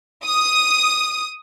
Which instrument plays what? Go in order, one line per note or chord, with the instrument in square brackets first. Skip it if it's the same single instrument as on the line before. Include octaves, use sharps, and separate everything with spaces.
[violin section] D#6